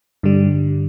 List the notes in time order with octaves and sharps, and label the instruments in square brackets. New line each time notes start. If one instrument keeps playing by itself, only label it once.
[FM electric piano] G2 D3 G3